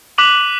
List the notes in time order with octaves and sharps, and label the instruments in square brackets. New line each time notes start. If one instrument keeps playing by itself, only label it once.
[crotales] D6 F#6 B6 D#7 F#7